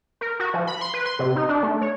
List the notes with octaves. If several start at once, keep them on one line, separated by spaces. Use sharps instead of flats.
A#4
F#4
F3
B5
C6
B4
C6
C3
D#4
D4
A3
C#5